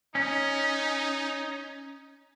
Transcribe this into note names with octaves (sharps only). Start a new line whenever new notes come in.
C#4 D#4